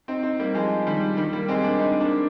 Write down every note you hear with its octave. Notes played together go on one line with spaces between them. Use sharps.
C4 D#4
C4 D#4
G3 A#3
F3 G#3
D#3 G3
D#3 G3
G3 A#3
G#3 C4
A#3 D4
C4 D#4
A#3 D4